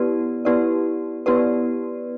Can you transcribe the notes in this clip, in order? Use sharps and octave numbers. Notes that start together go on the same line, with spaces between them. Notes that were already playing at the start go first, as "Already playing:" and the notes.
Already playing: B3 E4 G4 B4 D5
B3 E4 G4 B4 D5
B3 E4 G4 B4 D5